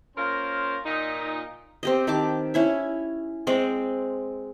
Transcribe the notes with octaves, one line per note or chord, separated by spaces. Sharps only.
A#3 C#4 F4 A#4 C5
A#2 D#4
C4 G4 D#5
D#3 G4 A5 D6
C#4 E4 E5
G#3 C4 D5 D#5